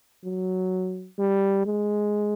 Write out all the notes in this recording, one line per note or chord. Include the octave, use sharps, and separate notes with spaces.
F#3
G3
G#3